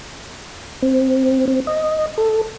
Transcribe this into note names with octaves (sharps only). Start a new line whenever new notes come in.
C4
C4
D#5
A4